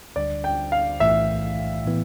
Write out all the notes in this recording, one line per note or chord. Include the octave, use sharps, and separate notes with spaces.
D2 D3 G3 D4 D5
G5
F5
B1 A2 E3 A3 E5
A2 E3 B3